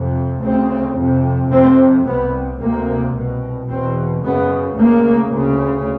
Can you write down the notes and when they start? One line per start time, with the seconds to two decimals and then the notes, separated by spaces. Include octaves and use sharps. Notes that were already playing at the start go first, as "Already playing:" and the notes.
Already playing: F2 C3
0.42 D2 C#3 C4
0.97 F2 C3
1.51 F2 C3 C4
2.06 C2 C3 B3
2.60 D2 C3 A#3
3.14 C2 B2
3.69 E2 B2 C4
4.23 F#2 C#3 B3
4.77 D2 C#3 A#3
5.31 D2 C#3